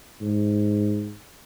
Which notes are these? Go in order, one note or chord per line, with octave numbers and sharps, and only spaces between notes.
G#2